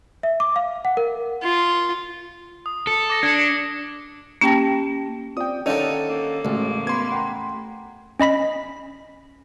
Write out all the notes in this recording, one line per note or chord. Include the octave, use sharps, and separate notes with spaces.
E5
D6
F5
F#5
A#4
F4
D#6
A4
D6 A#6
D4 G#6 C#7
A#3 C#4 G4 G5 A5 A#6
C4 F4 D5 G5 D#6
D3 D#3 C#4 D#4 A4 C#5 F5
A#3
A1 C#3 G#3 F#4
B3 B5 C6 G#6
F#5 G5 A#5
C#4 D#5 B5 B6